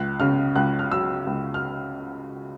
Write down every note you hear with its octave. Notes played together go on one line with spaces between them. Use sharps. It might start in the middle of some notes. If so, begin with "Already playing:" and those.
Already playing: C#2 F#6
C#3 F6
C#2 F#6
F6
F#3 E6
C#2
F6